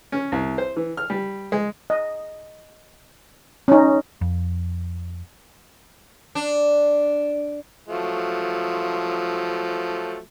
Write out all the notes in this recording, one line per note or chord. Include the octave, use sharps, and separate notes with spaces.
C#4
C2
C5
E3
F6
G3
G#3
D#5
C#4 D#4
F2
D4
F3 F#3 A3